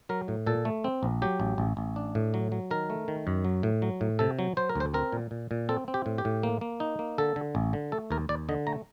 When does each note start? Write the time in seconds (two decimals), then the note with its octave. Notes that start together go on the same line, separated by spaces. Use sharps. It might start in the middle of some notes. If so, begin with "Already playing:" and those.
0.09 F#3 A#4
0.28 A2
0.46 A#2 A4
0.65 A3
0.84 C4
1.03 A#1
1.22 F#3 G4
1.40 A1
1.58 A1
1.77 A1
1.96 D4
2.15 A2
2.34 F#3
2.52 F#3
2.71 D#3 A#4
2.90 A3
3.08 D#3
3.27 F#2
3.44 F#3
3.63 A2
3.82 F#3
4.01 A2
4.19 C3 A4
4.39 F#3
4.57 F#3 C5
4.69 A#4
4.76 D2 C5
4.94 C4 A#4
5.12 A#2
5.31 A#2
5.51 A#2
5.69 C4 A4
5.88 C4
5.94 G4
6.06 A2
6.18 G4
6.25 A2
6.43 A#3
6.61 A#3
6.80 D#4
6.99 A#3
7.18 D3 A4
7.36 D3
7.55 A1
7.73 D3
7.92 A3 A4
8.11 D#2 A#4
8.29 D#2 D5
8.49 D3 D#5
8.67 A3 A#5